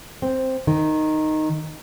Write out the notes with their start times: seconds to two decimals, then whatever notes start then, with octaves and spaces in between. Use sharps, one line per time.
0.22 C4
0.67 D#3